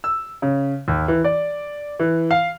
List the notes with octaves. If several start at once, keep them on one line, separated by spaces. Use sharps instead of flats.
E6
C#3
D#2
E3
D5
E3
F5